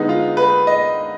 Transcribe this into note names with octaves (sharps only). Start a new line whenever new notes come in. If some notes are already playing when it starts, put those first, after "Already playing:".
Already playing: D3 G#3 B3 D#4
F4
B4
D#5